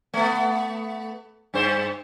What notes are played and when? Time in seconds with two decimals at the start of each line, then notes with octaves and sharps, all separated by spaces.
0.14 A3 B3
1.54 G2 C5